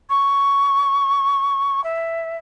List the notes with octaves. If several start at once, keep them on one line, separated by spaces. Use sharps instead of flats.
C#6
E5